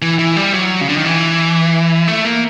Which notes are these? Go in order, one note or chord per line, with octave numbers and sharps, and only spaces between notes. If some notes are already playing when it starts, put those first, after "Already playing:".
E3
E3
G3
F#3
C#3
D3
D#3
E3
A3
A#3